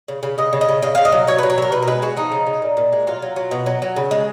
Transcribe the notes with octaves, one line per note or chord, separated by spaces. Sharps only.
C#3
C#3
C#3 D#5
C#3
D#5
C#3
C#3 D#5
C#3 F5
D#5
F#3
F#3 C#5
F#3 B4
C#5
F#3 A#4
B2 B4
A#4
G#3 B4
G#3 F#4
F3 D#4
C#3
C#3
A#2
A#2
G#3
F#3 F4
F#3
F#3
B2
F#3
F#3
C#3
G#3